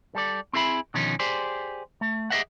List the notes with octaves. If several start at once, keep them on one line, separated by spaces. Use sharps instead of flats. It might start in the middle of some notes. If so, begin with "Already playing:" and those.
G3 A4 D5
C4 E4 G#4 E5 B5
B2 D3 D#3 F3 C#4 D#4
G4 G#4 C5 D5
A3
G4 G#4 A#4 D#5 E5 F#5